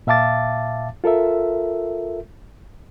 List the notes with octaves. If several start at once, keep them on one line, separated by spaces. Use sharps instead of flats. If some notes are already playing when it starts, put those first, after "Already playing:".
A#2 E5 F5 A5 D6 A6
F4 A4 A#4 E5